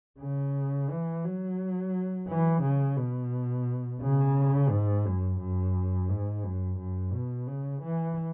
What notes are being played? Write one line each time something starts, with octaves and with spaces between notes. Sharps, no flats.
C#3
E3
F#3
E3
C#3
B2
C#3
G#2
F#2
F#2
G#2
F#2
F#2
B2
C#3
E3